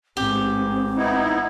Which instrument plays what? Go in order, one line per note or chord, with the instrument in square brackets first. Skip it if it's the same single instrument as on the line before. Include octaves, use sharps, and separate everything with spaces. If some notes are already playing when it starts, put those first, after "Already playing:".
[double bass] A1 G#2 [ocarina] C4 [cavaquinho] G4
[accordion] B3 D#4 E4